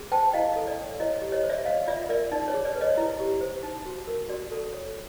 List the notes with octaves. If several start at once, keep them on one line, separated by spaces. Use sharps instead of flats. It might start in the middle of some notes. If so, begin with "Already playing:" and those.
Already playing: G#4
C5 G5 A5
E4 D#5 F5
A4
D5
C#5
E4 C#5 D#5
G4
C#5 D#5
C5
D5 E5
C#5 D#5 F5
F4 D5 E5
A#4 D5 E5
D#4 D5
C#5
G#4
D5
B4
C#5 D#5
E4
G4
C5
D#4
F#4
A#4
F#4 D5
A4
C#5